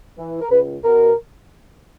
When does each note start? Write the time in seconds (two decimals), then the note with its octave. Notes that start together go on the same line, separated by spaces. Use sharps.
0.18 E3
0.41 A#4
0.50 C#2 B4
0.84 B2 A#4